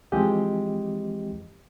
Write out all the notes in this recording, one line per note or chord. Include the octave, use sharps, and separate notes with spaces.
E3 F3 G#3 C4 G4 D#5